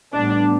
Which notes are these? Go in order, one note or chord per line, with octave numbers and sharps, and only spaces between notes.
A1 A2 G3 B3 D4